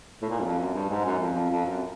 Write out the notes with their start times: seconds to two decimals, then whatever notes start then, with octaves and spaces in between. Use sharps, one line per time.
0.22 A2
0.29 A#2
0.40 F#2
0.44 F2
0.59 F#2
0.74 G2
0.89 G#2
1.05 F#2
1.19 F2
1.35 F2
1.50 F2
1.66 F#2